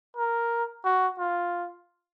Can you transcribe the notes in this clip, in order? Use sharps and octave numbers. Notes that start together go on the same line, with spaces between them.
A#4
F#4
F4